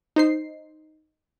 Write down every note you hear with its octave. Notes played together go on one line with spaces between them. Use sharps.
D#4 C5 C7